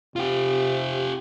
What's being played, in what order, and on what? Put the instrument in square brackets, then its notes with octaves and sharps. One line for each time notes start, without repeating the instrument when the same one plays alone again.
[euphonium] C3 [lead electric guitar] F4 G4